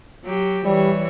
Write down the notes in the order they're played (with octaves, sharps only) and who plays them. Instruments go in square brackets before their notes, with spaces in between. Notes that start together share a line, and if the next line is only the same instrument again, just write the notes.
[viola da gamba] F#3 G4
[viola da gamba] E3 C#5 [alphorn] G3